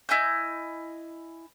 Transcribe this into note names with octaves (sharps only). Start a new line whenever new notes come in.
E4 D#5 G#5 G6